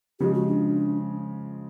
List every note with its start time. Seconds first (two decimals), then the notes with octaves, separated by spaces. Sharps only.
0.20 C#3 F3 G#3 G4
0.34 F#4
0.48 D4